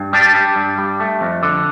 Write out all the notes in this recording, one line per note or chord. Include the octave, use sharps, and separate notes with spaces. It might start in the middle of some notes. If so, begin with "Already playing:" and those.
Already playing: G2
G3 D4
G3
G2
G3
A3
F2
D3